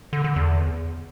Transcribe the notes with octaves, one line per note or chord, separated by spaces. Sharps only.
D3
D3
E2